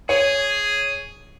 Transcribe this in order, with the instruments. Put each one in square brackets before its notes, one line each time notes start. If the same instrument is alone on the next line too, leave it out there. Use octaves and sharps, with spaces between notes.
[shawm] G#4 [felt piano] C#5